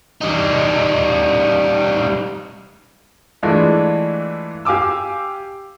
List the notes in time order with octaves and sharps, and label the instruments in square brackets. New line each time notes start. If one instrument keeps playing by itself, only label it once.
[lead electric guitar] G3 D#4
[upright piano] E3 G#3 A3 D4 E4 F4
G4 F5 G#5 D6 E6